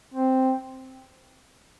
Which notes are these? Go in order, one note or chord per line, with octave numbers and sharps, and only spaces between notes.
C4